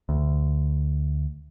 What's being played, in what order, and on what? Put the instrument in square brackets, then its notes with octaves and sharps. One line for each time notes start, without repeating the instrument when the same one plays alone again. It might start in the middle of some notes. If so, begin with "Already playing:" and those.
[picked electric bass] D2